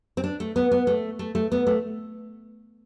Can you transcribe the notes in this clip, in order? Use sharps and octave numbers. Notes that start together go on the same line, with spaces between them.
C4
D4
A3
B3
B3
A3
A3
A3
B3
A3